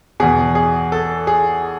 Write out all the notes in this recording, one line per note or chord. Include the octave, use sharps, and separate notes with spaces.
E2 B2 G#4
G#4
A4
G#4